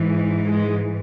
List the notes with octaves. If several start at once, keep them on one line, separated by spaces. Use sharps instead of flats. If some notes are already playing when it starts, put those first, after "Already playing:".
Already playing: G#2 E3
G#3